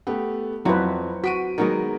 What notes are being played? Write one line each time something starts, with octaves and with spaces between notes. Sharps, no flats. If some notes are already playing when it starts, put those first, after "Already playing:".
A3 B3 G4
F2 F#3 C4 E4 F4 B4
F#4 B6 D7 D#7
D#3 F#3 G#3 B3 A#4 D#5